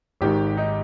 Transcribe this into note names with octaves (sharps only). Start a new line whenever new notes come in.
G#1 G#2 D#3 G4
D#4